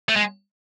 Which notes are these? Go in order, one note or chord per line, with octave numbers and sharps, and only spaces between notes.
A3
G#3